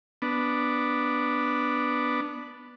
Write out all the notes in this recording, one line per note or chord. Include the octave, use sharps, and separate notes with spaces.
B3 D4